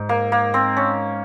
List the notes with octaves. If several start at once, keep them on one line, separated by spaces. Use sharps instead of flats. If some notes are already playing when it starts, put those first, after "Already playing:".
Already playing: G#2
A#3
A#3
C4
C#4